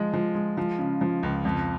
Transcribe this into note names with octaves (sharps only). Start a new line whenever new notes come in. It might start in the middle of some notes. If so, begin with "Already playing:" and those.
Already playing: F3 G#3
F3
G#3
F3
C#3
F3
C#2
F2